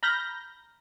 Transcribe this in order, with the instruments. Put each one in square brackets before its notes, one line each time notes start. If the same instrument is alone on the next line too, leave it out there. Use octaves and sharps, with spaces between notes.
[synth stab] A#5 B5 F6 G6 A#6